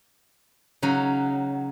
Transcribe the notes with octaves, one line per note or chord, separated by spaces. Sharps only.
C#3 F#3 D#4